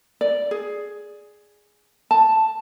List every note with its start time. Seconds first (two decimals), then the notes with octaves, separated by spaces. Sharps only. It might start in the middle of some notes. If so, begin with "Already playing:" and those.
0.21 D5
0.51 G#4
2.11 A5